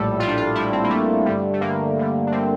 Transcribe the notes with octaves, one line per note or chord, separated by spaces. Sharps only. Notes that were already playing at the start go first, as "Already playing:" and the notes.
Already playing: A#1 A2 G3 A4
A#1 A2 G3 F4
D4
F4
A#1 A2 G3 E4
C4
A#3
A#1 A2 G3 A3
G2 D3 G3
A3
G2 D3 G3 A#3
G2 D3 G3
D4
D3 G3 C4